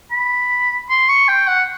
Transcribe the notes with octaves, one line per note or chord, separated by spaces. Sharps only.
B5
C6
C#6
G5
F#5